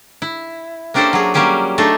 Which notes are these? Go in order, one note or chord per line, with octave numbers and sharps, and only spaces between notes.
E4
A#3 C#4 D4 G4 A4 C5
F#3 G#4
F#3 G3 A#3 C#4 G4 G#4
A3 D4 D#4 G#4 A4